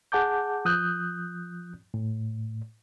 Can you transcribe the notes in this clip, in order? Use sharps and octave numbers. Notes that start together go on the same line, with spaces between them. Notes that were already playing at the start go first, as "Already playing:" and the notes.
G#4 F#5 A5 D6 G6
F3 D#6 F#6 G6
A2